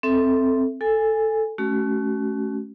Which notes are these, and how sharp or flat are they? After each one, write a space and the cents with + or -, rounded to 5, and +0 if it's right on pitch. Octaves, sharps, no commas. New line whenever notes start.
C4 +0 A4 +0 E5 +0
A4 +0 G#5 -10
A3 -30 C#4 +0 F#4 +30